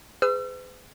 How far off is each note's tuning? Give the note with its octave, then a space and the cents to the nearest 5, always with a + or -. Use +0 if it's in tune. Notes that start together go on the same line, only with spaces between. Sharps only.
G#4 +0 B4 +40 E6 +40